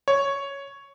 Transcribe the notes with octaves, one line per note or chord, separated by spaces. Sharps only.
C#5